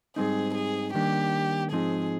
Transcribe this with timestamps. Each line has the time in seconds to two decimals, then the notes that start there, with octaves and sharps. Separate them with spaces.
0.16 G#2 G3 C4 D#4 G#4
0.55 G#4
0.94 D#3 G3 A#3 D4 G4
1.72 G#2 F3 C4 D#4 G#4